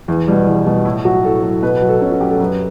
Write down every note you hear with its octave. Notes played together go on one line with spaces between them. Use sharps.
E2
B2 G3
E2
B2 G3
A2 E4
F#3 F#4
A2 A4
F#3
B2 B4
B4
F#3
A4
B2 C#4
F#4
F#3 G4
A4
F#2 B4